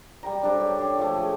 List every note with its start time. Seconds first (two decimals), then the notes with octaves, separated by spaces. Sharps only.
0.23 G3 G5 A#5
0.43 D4 G4 A4 C5
0.60 G4 C#5
0.79 C#5 G5 C6 D6
0.98 F3 A3
1.18 G#4